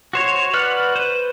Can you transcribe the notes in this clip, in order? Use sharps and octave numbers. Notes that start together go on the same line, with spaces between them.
F#4 C5 C#5
F#4 B4 D5 F#5 F6
B4 C5